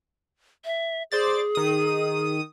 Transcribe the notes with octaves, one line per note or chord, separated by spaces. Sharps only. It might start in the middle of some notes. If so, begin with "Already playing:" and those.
E5
G#4 C5 D5 A6
D#3 D#6